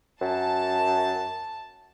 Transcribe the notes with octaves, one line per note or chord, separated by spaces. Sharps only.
F#2 A5